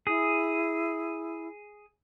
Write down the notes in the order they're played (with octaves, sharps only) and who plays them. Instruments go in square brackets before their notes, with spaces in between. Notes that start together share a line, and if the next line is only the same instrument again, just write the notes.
[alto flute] E4 [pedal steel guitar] G#4